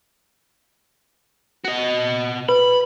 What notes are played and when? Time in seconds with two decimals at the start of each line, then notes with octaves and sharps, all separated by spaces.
1.65 F#4 D#5
2.49 B4 B5